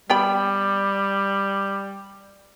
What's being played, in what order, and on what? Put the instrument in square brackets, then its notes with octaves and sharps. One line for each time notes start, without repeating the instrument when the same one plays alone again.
[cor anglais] G3 [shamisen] B3 G5 B5